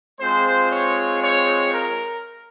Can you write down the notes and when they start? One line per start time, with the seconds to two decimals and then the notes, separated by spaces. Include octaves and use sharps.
0.20 G#3 C4 F4 C5
0.71 C#5
1.22 C#5
1.74 A#4